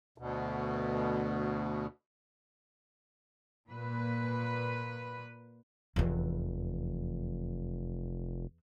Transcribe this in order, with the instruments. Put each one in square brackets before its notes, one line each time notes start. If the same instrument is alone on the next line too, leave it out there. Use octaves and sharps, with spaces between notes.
[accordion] D2 B2
[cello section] A#2 B4
[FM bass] F1 [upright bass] E2 E3